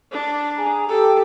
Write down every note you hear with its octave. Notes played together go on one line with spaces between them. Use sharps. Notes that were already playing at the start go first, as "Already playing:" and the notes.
D4
G#4 G#5 A#5
G4 A4 G5